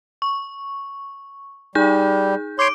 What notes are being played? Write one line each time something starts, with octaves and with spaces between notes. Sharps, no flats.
C#6
G3 D#4 G#4 G6
C#5 C6 D6 G6 D7